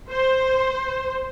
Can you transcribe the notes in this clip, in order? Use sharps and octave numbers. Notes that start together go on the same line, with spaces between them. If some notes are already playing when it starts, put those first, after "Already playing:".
C5